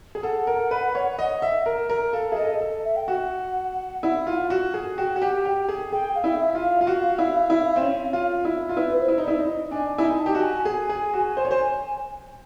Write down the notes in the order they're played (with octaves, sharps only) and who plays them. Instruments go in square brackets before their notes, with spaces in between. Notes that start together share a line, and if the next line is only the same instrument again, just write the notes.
[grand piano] G#4
[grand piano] A4 [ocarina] F#5
[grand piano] A#4
B4
C#5
D#5
E5
A#4
A#4
[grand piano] A4 [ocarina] F5
[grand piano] G#4 [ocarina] E5
[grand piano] A4 [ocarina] D#5
[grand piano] A4
[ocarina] E5
G5
[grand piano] F#4 [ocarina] F#5
[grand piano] E4
F4
F#4
G#4
[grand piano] F#4 [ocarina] G5
[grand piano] F#4
[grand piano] G4 [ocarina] F#5
[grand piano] G4 [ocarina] G5
[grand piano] G#4
[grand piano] G#4 [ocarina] G5
[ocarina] F5
[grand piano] E4
[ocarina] E5
[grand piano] F4
[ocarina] F5
[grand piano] F4
[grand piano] F#4 [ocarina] F5
[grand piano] E4
E4
C4
C#4
F4
E4
F4
[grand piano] E4 [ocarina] B4
[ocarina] C5
[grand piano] E4
D#4
[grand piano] E4 [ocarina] D5
[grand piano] D#4
[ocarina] D#5
[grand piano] D4 [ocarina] G#5
[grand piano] E4 [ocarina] G#5
[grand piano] D#4
[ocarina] A5
[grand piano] G4
F#4
[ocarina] G#5
[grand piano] G#4 [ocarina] G#5
[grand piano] G#4
F#4
C5
C#5
C5